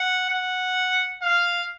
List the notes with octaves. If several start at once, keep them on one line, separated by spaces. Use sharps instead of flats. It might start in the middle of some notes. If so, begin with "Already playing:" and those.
Already playing: F#5
F#5
F5